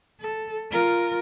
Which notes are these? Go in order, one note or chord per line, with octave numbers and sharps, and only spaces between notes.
A4
F4 A#4